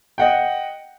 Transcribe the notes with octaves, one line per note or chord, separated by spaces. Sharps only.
D#5 F#5 G5